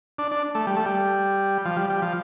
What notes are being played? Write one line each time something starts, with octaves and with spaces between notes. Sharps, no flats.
D4
D4
A3
G3
A3
G3
F3
G3
G3
F3